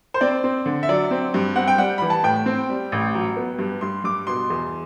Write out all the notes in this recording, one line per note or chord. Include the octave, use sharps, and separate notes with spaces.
C5
C4 D5
C4
D3
E5
F#3 D5
C4
G2
C4 F#5
G5
G3 F#5
E3 B5
A5
A2 G5
C4
G3
A1
F#3
B3
G2
G2 C6
G2 D6
B2 C6
E2